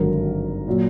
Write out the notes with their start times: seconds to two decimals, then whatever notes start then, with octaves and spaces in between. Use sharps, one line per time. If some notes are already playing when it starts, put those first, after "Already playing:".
Already playing: G#1 G2 D3 F#3 A#4
0.68 A#2 F#3